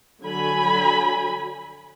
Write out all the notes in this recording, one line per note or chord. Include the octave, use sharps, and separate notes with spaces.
D3 F#3 G#5 B5